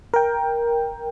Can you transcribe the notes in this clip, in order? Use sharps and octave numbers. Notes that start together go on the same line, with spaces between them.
A#4 G5